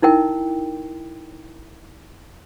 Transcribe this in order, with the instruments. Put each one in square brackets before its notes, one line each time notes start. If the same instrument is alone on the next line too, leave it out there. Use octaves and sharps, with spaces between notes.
[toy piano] D#4 E4 A#4 G5